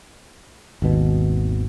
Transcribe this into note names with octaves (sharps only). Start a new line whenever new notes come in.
G#1 D#2 B2